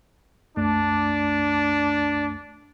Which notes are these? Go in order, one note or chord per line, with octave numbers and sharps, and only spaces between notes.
C2 F#2 A3 D4